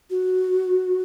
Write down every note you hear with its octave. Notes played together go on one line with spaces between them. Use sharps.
F#4